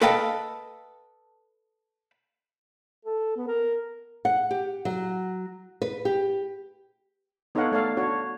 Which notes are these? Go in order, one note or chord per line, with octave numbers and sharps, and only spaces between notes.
A4 B4 D#5 F5 G5 A5
A4
B3
A#4
F#5
G4
F#3
B4
G4
B3 D#4 A4 C#5 F5 F#5
A3 A4 D5 F5
D4 F#4 C#5